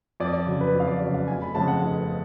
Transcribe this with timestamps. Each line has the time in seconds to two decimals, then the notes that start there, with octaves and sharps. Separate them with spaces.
0.20 F2 D5
0.33 D5
0.47 C#3 F#3
0.61 B4
0.74 F2
0.80 F5
0.88 D5
1.01 C#3 F#3 D5
1.14 F5
1.28 F1 G#5
1.42 B5
1.54 F2 C#3 F3 G#3 A5
1.68 F#5
1.81 F1